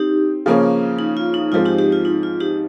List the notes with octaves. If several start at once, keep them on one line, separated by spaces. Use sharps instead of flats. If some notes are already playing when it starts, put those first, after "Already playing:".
Already playing: C4 D#4 G4
C#3 F3 A#3 C#4
D#4
F4
D#4
G#2 F3 G#3 C4 F4
D#4 G4
D#4 G4
F4
D#4
F4
D#4 G4